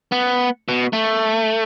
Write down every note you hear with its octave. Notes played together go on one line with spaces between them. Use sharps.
B3
B2
A3